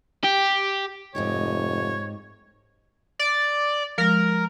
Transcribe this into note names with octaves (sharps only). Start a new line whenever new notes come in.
G4
F1 G#2 D#4 G4 C#5
D5
F3 G#3 A#4